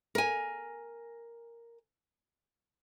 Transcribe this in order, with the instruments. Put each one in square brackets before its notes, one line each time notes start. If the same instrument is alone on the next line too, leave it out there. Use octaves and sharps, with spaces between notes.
[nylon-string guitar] A#4 G#5